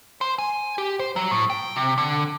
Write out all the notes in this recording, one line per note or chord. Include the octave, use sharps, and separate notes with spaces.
C5
G#5
G4
C5
F#3
A2
G5
C3
D3